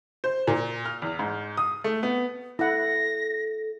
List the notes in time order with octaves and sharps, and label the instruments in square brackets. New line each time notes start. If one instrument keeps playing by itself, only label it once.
[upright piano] C5
A#2
F6
E2
G#2
D#6
A3
B3
[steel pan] E4 F#5 [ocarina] A4 [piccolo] A#6